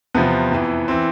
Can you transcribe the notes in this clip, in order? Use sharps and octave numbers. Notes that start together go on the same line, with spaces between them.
E2 C3 F3 B3
F2 E3
E3 C4